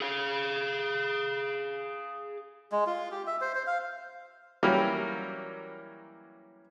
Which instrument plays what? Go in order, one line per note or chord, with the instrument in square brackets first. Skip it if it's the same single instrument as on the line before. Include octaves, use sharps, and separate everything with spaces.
[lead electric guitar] G#4 F5
[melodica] G#3
F4
G4
E5
C5
C5
F5
[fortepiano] E3 F#3 G3 A#3 C#4 A#4